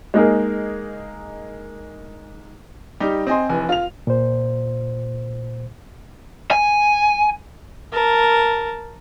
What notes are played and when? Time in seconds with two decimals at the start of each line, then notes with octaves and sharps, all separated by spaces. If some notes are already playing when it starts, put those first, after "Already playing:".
0.14 G#3 A#3 D#4 G#4 A#4
3.00 G3 D#4 G4
3.27 C4 D#5 G#5 C6
3.49 F1 E3 G#5
3.69 F4 F7
4.07 A#2 C5
6.51 G#5
7.92 A#4 A5